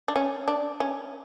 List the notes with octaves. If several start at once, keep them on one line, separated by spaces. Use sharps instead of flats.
D4
C#4
D4
C#4